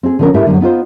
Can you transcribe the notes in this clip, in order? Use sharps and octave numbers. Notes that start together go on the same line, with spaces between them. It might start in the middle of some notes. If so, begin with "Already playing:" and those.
C4 G#4
D3 F3 B3 C#4 A#4
G#2 A3 E4 G4 A#4 E5
F#2 D3 F#3 G3 B3
B3 D#4 F4 C5